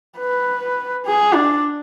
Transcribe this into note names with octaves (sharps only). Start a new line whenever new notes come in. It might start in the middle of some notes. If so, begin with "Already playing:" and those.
B4
G#4
D4